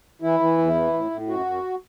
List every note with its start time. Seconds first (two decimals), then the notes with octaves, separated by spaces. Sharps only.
0.22 E3 E4
0.40 E3
0.58 E2
0.75 E3
0.93 A2
1.11 A2
1.28 F#2 F#4
1.46 F#2